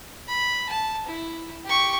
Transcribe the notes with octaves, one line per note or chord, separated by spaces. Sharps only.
B5
A5
E4
G4 C#6